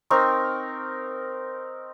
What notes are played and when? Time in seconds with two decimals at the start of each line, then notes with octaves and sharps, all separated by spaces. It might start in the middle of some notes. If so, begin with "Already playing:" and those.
0.10 C4 D#4 A#4 C#6